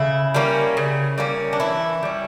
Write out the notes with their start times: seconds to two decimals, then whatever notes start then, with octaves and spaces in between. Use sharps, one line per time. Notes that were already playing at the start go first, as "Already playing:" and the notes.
Already playing: C#3 E4
0.34 G3 A#3 C#4
0.77 C#3
1.18 G3 A#3 C#4
1.53 D4
1.60 E3 E4
2.03 G3 C#4